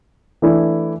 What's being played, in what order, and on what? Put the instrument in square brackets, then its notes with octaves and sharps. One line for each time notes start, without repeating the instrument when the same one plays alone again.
[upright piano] E3 A3 D4 E4